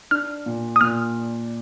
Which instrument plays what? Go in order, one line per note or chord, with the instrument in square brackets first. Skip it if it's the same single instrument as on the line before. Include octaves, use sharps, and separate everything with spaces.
[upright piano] D4 [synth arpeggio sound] F6
[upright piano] A#2
[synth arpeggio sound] D#6
[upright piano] A#2 [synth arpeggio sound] F6